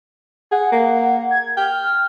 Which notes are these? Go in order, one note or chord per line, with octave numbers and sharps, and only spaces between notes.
G#4 F#5
A#3
G#6
G5 F6